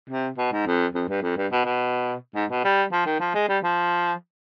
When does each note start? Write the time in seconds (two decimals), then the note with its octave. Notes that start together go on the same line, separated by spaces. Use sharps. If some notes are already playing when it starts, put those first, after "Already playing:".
0.10 C3
0.38 B2
0.52 G#2
0.66 F2
0.95 F2
1.09 G2
1.22 F2
1.37 G2
1.52 B2
1.65 B2
2.35 G#2
2.50 B2
2.64 G3
2.92 F3
3.06 D#3
3.20 F3
3.34 G#3
3.49 G3
3.64 F3